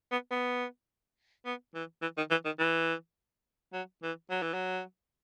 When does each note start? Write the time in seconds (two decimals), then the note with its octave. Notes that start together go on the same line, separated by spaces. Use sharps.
0.12 B3
0.31 B3
1.45 B3
1.75 E3
2.02 E3
2.17 D#3
2.31 E3
2.45 D#3
2.59 E3
3.73 F#3
4.03 E3
4.31 F#3
4.42 E3
4.54 F#3